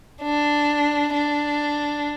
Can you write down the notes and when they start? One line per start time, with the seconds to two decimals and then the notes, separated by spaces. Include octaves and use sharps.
0.22 D4
1.14 D4